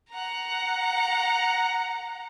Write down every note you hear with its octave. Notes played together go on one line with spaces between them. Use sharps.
F#5 A#5